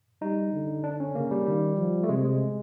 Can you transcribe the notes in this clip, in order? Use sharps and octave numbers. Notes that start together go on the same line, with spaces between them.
G3 D#4
D3
D4
C#4
C#3 A#3
G3
D#3 G3
F3
A3
C3 G#3
G#3